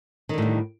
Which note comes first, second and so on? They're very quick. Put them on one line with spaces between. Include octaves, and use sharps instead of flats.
D#3 D3 A2 G3